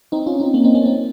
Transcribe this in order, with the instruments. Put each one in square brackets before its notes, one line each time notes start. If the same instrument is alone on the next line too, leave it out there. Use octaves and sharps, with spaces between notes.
[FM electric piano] C4 D#4
C#4 F4
C4 D#4
A#3 C#4
C4 D#4
A#3 C#4
C4 D#4